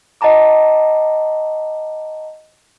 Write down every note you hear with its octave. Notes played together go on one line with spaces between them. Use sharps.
D#5 F#5 A5 A#5 D6